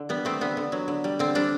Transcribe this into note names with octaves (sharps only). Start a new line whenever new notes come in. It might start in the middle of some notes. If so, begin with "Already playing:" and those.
Already playing: D3
G3 B3
A3 C4
D3 B3
D3
F#3
D3
G3
D3 C4
G3 D4